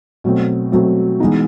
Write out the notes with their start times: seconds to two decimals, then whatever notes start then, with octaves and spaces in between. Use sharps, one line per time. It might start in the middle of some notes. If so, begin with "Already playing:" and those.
0.24 B2 F#3 A3 C4
0.72 B2 F#3 A3 C4
1.20 E3 G#3 B3 D#4